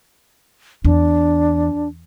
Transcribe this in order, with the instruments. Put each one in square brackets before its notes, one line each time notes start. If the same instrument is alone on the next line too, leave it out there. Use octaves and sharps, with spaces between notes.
[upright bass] E2 [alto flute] D4